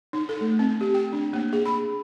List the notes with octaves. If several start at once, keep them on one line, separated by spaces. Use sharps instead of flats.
D#4
A4
A3
C4
G4
G5
D4
A#3
G#4
B5